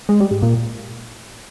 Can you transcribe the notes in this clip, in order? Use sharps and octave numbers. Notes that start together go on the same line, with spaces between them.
G#3
G3
G#2
A#2